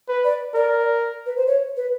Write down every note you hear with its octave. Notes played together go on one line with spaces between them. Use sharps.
B4
D5
A#4 D5
B4
C5
C#5
B4